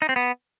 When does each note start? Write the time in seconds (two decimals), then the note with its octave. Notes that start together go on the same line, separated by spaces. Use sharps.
0.02 D#4
0.09 C4
0.16 B3